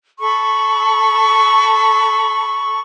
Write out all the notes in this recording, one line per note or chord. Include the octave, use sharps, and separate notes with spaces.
A4 B5 C#6